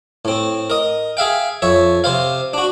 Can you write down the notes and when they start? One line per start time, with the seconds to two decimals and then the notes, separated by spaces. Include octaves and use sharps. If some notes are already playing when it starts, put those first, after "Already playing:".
0.25 A2 C4
0.70 A#4 D#5
1.17 G#4 E5 F5 G5
1.62 F2 C#5 E5
2.04 C3 C5 F5
2.53 D4 F#4